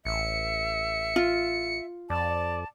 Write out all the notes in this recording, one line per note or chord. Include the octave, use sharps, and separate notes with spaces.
A1 E5 C#7
F4
F2 D5 A5